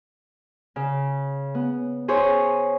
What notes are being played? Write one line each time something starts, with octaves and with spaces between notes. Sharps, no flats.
C#3
B3
G#4 C5 C#5